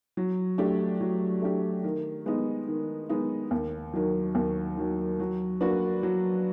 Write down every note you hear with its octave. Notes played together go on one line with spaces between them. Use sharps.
F#3
A3 D4 G4
F#3
A3 D4 G4
D#3
G#3 B3 D#4
D#3
G#3 B3 D#4
D#2
D#3 F#3
D#2
D#3 F#3
F#3
A#3 D4 F#4 B4
F#3